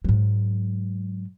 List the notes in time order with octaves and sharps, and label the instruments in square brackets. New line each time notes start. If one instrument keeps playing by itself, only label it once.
[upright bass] G#2 F#3